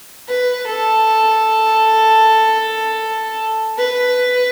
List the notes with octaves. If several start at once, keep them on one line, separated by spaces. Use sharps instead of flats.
B4
A4
B4